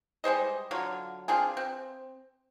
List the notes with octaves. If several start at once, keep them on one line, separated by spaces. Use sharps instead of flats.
G3 G#3 C5 D#5
D3 F#3 F4 C#5
C4 D4 F4 G#4
C4